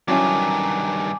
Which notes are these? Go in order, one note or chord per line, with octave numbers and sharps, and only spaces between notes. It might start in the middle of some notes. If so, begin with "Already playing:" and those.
G2 D#3 F#3 C#4 E4 G#5 A5 D6